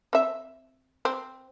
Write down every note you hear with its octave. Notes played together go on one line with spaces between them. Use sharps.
C4 E5
C4